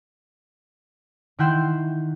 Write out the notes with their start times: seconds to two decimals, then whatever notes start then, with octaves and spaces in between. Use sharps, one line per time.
1.39 D#3 E4 F#5 G5 C6 E7